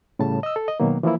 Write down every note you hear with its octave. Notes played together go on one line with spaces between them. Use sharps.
A2 C#3 G3 A5
D#5 E6
A4
D#5
B2 D#3 F#3 A#3
E3 F3 A#3 E4